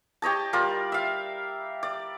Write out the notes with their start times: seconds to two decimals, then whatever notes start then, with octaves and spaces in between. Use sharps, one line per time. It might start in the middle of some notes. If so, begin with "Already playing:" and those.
0.22 G4 C#5 D#5 A5
0.53 G3 F4 A#4 D5
0.92 E5 F5
1.83 D5